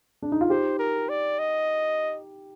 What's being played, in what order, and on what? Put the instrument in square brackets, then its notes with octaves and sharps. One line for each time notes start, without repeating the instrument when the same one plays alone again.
[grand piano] D4
D#4
F4
[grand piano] D#4 G4 [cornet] C5
[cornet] A#4
D5
D#5